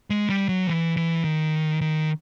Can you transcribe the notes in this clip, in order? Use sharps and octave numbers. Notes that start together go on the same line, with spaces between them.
G#3
G3
F#3
E3
E3
D#3
D#3